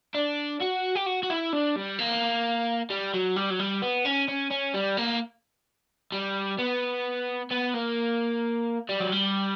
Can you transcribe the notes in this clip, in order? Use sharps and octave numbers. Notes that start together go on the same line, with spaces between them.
D4
F#4
G4
F#4
F#4
E4
D4
G3
A#3
G3
F#3
G3
F#3
G3
B3
C#4
C#4
C#4
G3
A#3
G3
B3
B3
A#3
G3
F#3
G3